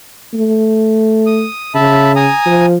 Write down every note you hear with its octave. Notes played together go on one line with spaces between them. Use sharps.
A3
D#6
C#3 E5 A5 B5
G#5 A#5 D#6
F3